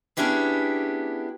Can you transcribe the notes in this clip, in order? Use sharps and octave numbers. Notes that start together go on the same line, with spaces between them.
B3 C#4 D4 E4 G4 G#4